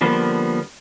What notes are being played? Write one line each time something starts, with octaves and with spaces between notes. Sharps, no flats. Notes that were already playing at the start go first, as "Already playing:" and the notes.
D3 F3 G3 A#3 B3